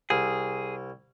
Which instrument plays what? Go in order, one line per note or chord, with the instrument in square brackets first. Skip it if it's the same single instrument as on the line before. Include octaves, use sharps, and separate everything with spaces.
[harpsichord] C2 [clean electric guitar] G#4